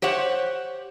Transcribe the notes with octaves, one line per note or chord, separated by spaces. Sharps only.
G4 C5 C#5 F#5